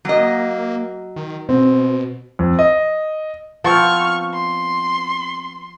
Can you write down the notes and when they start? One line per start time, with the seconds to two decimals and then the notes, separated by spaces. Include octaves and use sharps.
0.05 F#3 A#3 D#5
1.16 D#3
1.49 B2 C4
2.39 F2
2.59 D#5
3.64 F3 B3 C4 C#6 F6
4.34 C6